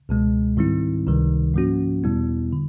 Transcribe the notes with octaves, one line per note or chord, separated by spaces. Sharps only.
C#2 B2 G#3
G#2 D#3 G3 C4 E4
C#2 C3 D#3 G3
G#2 F3 A#3 C#4 F#4
E2 B2 G3 B3 E4
D3